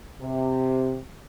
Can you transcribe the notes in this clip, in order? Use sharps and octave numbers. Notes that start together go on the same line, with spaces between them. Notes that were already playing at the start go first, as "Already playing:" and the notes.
C3